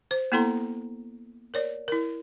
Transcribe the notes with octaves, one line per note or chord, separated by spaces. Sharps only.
C5
A#3 B3 E4 A4 A#5 C6
A#4 C#5 D5
E4 A#4